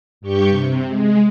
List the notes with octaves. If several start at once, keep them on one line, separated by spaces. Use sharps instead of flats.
G2 G4 C#6 G6
C3
G#3